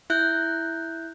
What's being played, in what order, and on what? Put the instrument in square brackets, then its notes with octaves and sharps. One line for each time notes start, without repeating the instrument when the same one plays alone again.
[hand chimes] E4 E5 F#6 G6